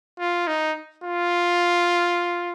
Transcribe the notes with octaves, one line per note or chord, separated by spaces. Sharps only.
F4
D#4
F4